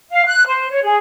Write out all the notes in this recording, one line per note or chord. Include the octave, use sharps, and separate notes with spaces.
F5
F#6
C5
C#5
G#4